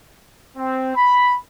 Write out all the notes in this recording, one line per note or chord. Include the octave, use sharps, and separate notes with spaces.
C4
B5